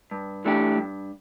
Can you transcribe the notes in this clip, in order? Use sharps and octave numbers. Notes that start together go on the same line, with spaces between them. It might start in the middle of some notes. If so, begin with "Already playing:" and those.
G2
E3 A3 D4 G4
G2